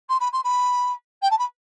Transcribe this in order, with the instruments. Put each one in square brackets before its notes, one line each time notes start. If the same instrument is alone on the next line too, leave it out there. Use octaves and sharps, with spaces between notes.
[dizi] C6
B5
C6
B5
G5
A5
B5